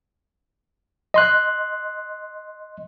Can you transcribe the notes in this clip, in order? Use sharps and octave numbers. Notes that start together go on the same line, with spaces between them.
D#5 C6 F#6